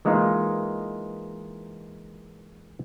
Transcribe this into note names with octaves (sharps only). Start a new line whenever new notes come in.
E3 G#3 A#3 D#4 F4